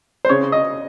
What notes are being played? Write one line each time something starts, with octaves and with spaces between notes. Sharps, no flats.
C5
C#3 C#5
D#5